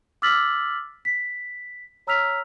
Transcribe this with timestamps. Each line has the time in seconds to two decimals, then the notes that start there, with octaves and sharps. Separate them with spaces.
0.22 D6 E6 F6 A6 B6 F#7
1.05 B6
2.07 C#5 A#5 E6 F6 B6 F7